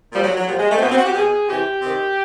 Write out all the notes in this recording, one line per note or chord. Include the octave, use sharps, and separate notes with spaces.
A#2 F3 G3
F#3
F#3
A#2 F3 G3
G#3
A3
C4
B2 B3
C4
F#4
G4
B2 G#4
C3 E3 G4
C3 D#3